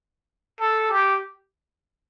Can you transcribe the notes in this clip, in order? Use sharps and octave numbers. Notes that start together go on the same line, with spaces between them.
A4
G4